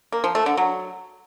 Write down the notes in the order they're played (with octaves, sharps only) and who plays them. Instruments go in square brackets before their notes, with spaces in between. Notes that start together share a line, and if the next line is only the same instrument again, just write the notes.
[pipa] A#3
F3
A3
D3
F#3